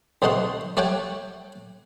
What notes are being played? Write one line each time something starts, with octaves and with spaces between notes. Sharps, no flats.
B1 C3 A3 D#4 F#5 C6
A3 G4 C#5 F#5 G5